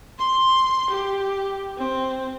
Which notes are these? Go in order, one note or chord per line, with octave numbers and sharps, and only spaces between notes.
C6
G4
C4